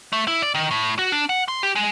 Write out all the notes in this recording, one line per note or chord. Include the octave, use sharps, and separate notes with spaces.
A3
E4
D5
D#3
A2
F#4
D4
F#5
C6
G4
G#3